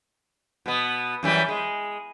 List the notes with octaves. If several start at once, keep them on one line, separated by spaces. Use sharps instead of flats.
B2 B3
F#2 E3 G3
G#3